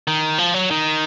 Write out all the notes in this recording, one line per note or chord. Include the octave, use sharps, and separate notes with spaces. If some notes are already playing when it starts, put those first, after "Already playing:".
D#3
F3
F#3
D#3